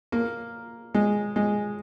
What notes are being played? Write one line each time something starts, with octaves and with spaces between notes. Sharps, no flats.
A#3
G#3
G#3